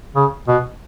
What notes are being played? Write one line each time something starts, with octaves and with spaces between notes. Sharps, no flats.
C#3
B2